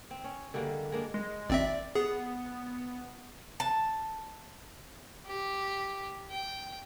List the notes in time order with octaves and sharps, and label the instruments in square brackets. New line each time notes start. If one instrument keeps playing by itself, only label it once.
[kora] C4
C#4
D3 G3 G#3 A#3
G#3 A#3 D4
[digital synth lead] G#3
[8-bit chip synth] G#1 C4 E5 [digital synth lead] D5
[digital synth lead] B3 [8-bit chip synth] G#4
[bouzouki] A5
[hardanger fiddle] G4
G5